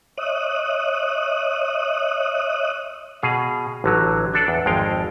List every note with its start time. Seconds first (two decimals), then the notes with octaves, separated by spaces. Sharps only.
0.17 C#5 D#5 E5 D#6 F#6
3.22 B2 G#4 F5
3.84 A1 D3 F#3
4.33 D4 A4 D5 A5
4.48 E2
4.66 G#1 F2 G#3 F5 G5